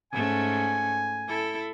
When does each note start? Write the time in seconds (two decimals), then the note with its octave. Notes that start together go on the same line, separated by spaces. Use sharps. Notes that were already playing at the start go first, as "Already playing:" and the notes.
0.12 G#2 A3 C#4 G#5
1.27 E4 A4